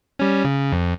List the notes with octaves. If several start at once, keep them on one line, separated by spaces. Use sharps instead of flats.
G3 C#4
C#3
F2